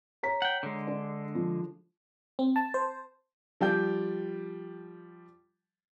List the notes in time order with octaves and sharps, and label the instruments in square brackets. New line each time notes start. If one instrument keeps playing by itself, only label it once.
[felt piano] C#5 A#5 B6
[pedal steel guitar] F#5 G5
D3 G#3
[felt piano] D4
F3
[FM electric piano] C4
A5
C5
[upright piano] F3 G3 G5 G6